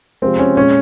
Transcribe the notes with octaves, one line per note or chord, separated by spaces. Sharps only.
C3 F3 G#3 C4
C#4
A#2 G#3 C#4